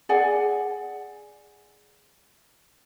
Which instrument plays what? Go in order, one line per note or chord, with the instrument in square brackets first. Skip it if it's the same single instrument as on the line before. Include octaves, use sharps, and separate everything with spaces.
[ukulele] G#4 D5 F#5 G#5